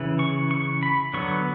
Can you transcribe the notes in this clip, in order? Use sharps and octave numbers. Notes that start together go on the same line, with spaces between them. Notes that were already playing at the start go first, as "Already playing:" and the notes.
Already playing: C#3 E3
C#6
C#6
B5
D3 F#3 B3 C#6